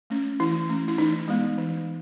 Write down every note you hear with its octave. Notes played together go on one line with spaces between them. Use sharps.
A3 C#4
E3 E4
A3 C#4
E4
E3 D#4
G#3 B3
E3